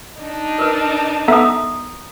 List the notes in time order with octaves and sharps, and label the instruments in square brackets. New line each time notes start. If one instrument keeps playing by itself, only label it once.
[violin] D4 D#4
[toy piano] A#4 B4
[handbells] B3 A4 E5 [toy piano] A#5 D#6